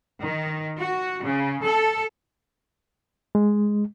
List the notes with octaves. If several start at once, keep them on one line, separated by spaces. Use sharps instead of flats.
D#3
F#4
C#3
A4
G#3